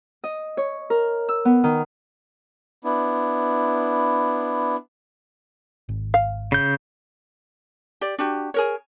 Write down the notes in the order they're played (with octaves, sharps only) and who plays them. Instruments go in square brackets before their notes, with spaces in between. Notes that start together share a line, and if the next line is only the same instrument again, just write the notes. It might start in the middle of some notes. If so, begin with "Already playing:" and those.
[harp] D#5
C#5
A#4
E6
B3
D#3
[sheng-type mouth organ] B3 D4 E4
[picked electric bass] G#1
[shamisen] F5
[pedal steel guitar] C#3 G6
[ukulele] G4 D5
D4 F#4 G4
G#4 A#4 C#5